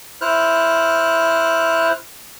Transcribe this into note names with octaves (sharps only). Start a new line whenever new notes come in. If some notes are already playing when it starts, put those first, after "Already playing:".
E4 C5 F6 F#6